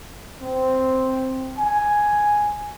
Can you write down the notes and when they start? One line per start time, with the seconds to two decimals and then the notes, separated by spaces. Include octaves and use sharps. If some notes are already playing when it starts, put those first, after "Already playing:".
0.42 C4
1.58 G#5